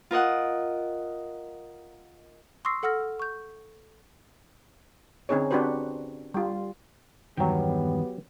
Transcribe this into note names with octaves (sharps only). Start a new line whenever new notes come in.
F4 A#4 D#5 F#5
C6 C#6 D#6 E6 A#6 C7
A4 F#5 E6 F6 A#6
C#6 G6
D3 C4 C#4 D#4 G#4 C#5
C4 D4 F#4 G4 B4 C5
G3 F4
E2 G2 D#3 F#3 B3 G4 G5